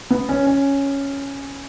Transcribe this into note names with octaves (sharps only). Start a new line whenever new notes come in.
B3
C#4
C#4